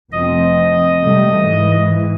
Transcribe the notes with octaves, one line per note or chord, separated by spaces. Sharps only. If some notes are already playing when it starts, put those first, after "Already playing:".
F1 F3 C4 D#5
C3 G3 A3
G#2 E3